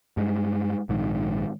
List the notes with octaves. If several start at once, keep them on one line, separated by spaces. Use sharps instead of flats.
G2 G#3
A#1 G#2 D#3